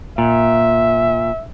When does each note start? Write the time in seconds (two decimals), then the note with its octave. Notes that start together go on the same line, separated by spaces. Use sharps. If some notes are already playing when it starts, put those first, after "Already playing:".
0.18 A#2 E5